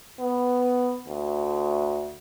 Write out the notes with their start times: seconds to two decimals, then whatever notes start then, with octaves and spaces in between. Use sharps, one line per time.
0.20 B3
1.08 D2